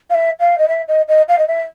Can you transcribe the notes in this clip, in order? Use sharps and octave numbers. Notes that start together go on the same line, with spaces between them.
F5
E5
F5
D#5
E5
D#5
D#5
F5
D#5
E5